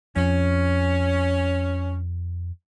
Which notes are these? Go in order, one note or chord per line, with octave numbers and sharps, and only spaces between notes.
F2 C#4